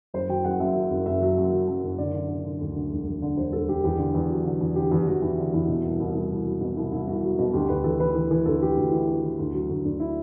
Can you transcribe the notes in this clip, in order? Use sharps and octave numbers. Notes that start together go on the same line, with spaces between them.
F#1 C5
F#3 G5
F#1 F#5
F#2 E5
F#3
F#1
F#1 E5
F#3
F#2
F#3
F#2
F#1
D3 D5
D3
D3
D3
D2
D3
E1
E1
D3
E1 C5
E1 A4
E1 G4
E2 G4
D3
E2
F#3
D3
E2
D3 G4
E2 G4
E2 F#4
E2 E4
D3 D4
E2 E4
B2
C2
C2
C2
C2
F#3
B2 F#4
C2 E4
C2 E4
C2 F#4
F#3
B2 F#4
D2 G4
D2 B4
E3 A4
E3 B4
E3
E3
D2 A4
E3 G4
D2 F#4
E3 E4
E3
E3
D2
F#3
D2
D2 D4
E4